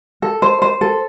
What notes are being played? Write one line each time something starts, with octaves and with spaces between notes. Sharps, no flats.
A4
C5
C5
A4